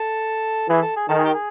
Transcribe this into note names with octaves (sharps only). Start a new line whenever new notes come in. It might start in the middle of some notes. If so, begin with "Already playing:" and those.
Already playing: A4
E3 G#4
A4
G#4
D#3 A4
G#4
G4
G#4